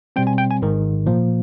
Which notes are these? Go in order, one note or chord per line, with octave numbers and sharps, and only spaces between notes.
B2 G3 C4 G5
G#5
G5
G#5
G#1 G#2 D#3
A#2 F3 A#3